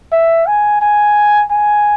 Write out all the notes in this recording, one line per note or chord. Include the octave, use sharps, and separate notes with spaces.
E5
G#5
G#5
G#5